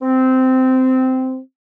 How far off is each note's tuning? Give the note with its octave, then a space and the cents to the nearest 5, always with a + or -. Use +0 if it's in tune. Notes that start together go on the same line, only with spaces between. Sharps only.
C4 -15